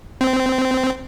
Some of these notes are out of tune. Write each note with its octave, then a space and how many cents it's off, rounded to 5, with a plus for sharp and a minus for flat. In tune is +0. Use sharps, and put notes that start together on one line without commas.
C4 -15